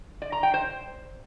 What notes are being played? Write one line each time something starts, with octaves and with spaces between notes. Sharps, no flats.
D5
A#5
G5
C5